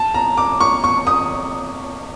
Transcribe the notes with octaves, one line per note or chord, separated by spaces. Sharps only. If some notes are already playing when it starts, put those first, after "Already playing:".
Already playing: A5
A#5
D6
C#6
C#6
D#6